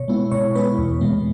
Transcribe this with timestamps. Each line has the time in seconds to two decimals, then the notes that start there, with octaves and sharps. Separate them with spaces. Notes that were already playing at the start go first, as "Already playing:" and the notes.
Already playing: B2 C#5
0.08 G#3 B3 E4
0.31 B2 C#5
0.55 G#3 B3 E4 B4
0.78 E2
1.01 B2 G#3 B3